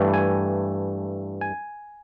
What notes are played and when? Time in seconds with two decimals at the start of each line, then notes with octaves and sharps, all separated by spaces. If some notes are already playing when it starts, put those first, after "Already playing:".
Already playing: G2 E3 A3
0.14 G#5
1.41 G#5